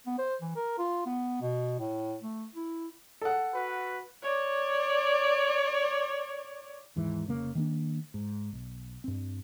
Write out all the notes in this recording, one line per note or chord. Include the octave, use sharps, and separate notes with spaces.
B3
C5
E3
A#4
F4
B3
B2
A2
A3
E4
A4 F#5
F#4 B4
C#5 D5
D#2 G#2 E3
F1 C#3 A#3
D#3 A#3 D4
G#2
B1
G2 C4